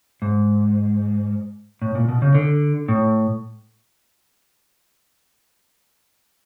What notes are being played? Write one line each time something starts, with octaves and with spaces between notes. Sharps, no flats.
G#2
A2
A#2
B2
C#3
D3
A2